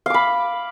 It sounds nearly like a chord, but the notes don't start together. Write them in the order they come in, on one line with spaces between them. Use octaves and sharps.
F5 D6 B5